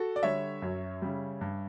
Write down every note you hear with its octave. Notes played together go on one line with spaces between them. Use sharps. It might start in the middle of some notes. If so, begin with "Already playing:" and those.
Already playing: F#4 A4
D5
D3 G3 C#5 E5
F#2
C#3 G3
G2